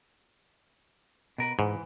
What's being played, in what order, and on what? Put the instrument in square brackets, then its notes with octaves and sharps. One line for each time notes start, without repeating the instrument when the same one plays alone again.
[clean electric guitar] B2 A#4 B4
[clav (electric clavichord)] G#2 [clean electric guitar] E3